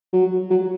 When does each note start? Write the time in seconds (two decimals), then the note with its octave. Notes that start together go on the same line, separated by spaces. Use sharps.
0.13 F#3
0.50 F#3